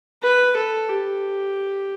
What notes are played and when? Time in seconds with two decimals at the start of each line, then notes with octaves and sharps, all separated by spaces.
0.23 B4
0.57 A4
0.89 G4